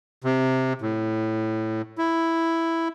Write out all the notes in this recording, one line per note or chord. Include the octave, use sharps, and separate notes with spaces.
C3
A2
E4